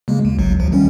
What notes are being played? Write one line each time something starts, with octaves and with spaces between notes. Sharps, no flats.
C#3 G#3 A#3
D#2
G#1 C#2 F#3
D2 F3
D#3 G3 C#4